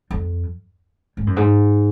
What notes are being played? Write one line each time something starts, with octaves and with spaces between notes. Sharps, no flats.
F2
G#2
F#2
G#2